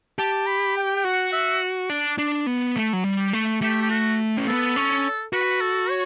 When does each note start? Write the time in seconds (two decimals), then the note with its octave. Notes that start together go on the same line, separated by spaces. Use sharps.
0.19 G4 A5
0.47 B5
0.76 G5
0.96 G5
1.04 F#4 F#5
1.32 E5
1.90 D4
2.18 D4
2.47 B3
2.76 A3
2.93 F#3
3.04 G3
3.33 A3
3.62 A3 G4
3.82 G4
3.90 F#4
4.37 C#4
4.47 B3 A4
4.76 C#4
5.33 F#4 B4
5.61 A4
5.90 C#5